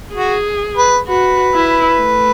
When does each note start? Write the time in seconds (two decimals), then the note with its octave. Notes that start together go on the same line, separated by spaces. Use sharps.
0.15 F#4 G#4
0.77 B4
1.07 F#4 B4
1.54 E4
2.01 A3